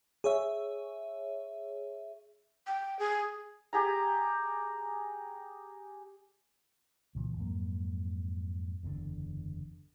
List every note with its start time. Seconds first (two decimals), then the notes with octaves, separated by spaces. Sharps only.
0.24 G#4 C#5 E5
2.67 G5
2.99 G#4
3.73 G4 G#4 A#5
7.15 C#2 A#2 E3
7.37 F2 G#2 F#3 A#3
8.83 F#1 E2 A2 D3